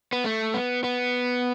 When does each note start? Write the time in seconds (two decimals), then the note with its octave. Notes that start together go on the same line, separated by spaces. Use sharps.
0.13 B3
0.24 A3
0.54 B3
0.84 B3